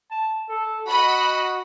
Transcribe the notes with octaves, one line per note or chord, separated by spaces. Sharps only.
A5
A4
F#4 D#5 F#5 B5